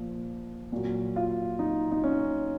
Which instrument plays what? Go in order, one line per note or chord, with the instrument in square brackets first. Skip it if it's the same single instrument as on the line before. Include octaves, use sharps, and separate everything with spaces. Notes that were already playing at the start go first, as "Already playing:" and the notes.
Already playing: [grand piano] A#2 F3
A#2 F#3
F4
D#4
D#4
C#4